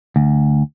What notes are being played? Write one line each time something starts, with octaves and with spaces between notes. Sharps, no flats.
D2